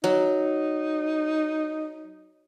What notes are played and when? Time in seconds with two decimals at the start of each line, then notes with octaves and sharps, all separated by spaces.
0.04 F#3 D#4